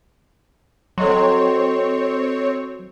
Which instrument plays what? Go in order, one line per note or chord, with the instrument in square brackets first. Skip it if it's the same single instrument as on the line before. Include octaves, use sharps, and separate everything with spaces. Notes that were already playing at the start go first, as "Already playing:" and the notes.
[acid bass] F#3 [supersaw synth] C4 C#5 [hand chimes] A4 D#5 C6